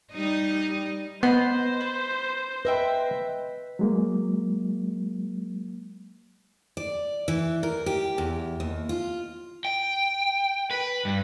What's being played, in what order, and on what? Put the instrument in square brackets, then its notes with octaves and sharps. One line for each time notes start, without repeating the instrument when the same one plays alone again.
[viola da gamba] G3 D#4 D#5
[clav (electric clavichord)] B3 [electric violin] C5 [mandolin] D#5 B5 C6
[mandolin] B4
[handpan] B4 [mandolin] D#5 E5 G5
[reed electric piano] F#3 G#3 A#3
[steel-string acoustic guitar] D5
E3
A#4
G4
E2
D#2
F4
[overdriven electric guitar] G5
B4
G2